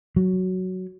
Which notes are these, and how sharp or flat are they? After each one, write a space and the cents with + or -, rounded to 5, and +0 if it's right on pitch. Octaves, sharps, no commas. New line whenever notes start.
F#3 +5